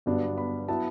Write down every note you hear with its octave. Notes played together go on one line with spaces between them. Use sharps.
G1 G2 F#3 B3 D4
B5
F#3 B3 E4 A5